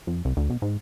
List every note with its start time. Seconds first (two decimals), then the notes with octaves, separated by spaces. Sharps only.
0.07 F2
0.25 C2
0.37 D2
0.50 B1
0.62 G#2